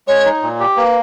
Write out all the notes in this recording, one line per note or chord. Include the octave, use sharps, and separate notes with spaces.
G#3 C#5
D#4
A#2
G4
A#3 B4